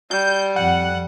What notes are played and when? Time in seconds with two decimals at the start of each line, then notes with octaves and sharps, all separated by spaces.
0.11 G3 G6
0.56 F2 F#5